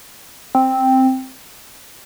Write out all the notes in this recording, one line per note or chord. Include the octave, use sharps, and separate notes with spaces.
C4